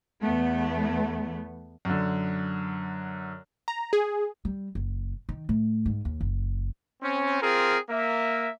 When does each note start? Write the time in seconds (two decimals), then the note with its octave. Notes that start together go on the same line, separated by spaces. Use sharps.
0.23 E2 A3 B3
1.85 F#2 D3
3.68 A#5
3.93 G#4
4.45 G3
4.75 F#1
5.29 D#3
5.49 A2
5.86 G#2
6.05 D#2
6.21 F#1
7.02 C4 C#4
7.42 C4 F4 G#4 A#4
7.90 A#3 E5